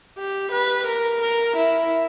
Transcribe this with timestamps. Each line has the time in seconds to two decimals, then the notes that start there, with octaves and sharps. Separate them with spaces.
0.18 G4
0.52 B4
0.86 A#4
1.21 A#4
1.56 E4